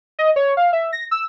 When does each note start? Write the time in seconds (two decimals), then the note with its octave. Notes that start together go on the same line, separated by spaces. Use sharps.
0.19 D#5
0.36 C#5
0.57 F5
0.73 E5
0.93 A#6
1.11 E6